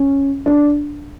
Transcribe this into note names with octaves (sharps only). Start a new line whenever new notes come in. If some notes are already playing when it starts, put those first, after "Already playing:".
Already playing: C#4
D4